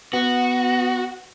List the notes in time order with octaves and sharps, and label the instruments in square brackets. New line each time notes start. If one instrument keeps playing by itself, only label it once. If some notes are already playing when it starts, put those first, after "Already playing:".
[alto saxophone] B3 [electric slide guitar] F#4